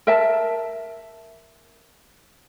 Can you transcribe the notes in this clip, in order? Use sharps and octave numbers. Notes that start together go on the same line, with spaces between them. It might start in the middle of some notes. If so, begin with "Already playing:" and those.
A#4 E5 A5